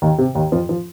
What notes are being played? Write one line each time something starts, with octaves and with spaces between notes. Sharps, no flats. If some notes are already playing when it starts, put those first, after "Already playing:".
D#2 D#3
C3
D#2 D#3
F2 F3
F3